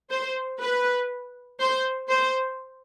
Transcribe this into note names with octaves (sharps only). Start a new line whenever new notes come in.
C5
B4
C5
C5